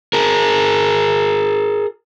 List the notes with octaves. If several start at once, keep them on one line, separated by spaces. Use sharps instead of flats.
G#4 A#4